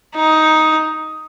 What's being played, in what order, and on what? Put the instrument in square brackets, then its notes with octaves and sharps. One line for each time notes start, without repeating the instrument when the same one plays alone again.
[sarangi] D#4